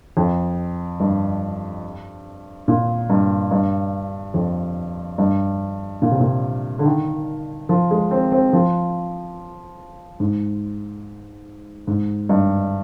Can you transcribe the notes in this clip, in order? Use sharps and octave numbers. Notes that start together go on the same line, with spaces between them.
F2
G2
A#2
G2
G2
F2
G2
A#2
C3
A#2
D3
D#3
F3
G#3
C4
C4
F3
G#2
G#2
G2